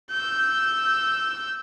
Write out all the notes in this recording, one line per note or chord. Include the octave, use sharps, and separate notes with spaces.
E6 G6